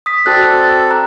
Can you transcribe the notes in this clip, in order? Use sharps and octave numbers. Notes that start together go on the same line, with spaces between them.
D#6 B6
C4 F#4 A4 D5 F#6
A#5 F#6